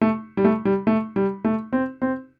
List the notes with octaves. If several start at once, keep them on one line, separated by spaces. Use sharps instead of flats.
A3
G3
A3
G3
A3
G3
A3
C4
C4